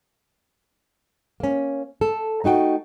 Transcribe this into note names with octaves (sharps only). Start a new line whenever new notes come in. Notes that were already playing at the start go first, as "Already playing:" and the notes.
A#3 C#4
A4
A3 D#4 F#4 G5